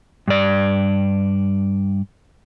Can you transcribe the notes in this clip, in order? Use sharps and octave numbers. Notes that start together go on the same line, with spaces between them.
G2 D5